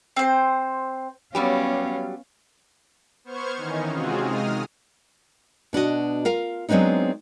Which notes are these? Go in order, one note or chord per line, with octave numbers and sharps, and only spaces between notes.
C4 C5
F#3 G3 B3 C#4 G4 C#5 F5 B5
B3 C5 C#6 F6 G#6
D#3 E3 C#4 D#4
C3 G#3 C4 F4 F#4 G#4
D#3 G#3 D#6 F6
B2 D4 F#4 D#5
F4 A#4 F5
F#3 G#3 B3 C4 D4 D#4